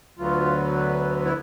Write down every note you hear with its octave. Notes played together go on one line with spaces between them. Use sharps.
D2 D3 F#3 B3 F4
E4